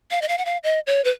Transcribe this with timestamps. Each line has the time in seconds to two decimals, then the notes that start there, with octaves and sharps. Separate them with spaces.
0.11 F5
0.22 D#5
0.28 F5
0.38 F#5
0.45 F5
0.64 D#5
0.87 C#5
1.04 B4